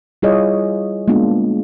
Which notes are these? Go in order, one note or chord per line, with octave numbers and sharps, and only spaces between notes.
G3 E4 F4 G#4 C#5 D#5
G#3 A#3 B3 D4 F4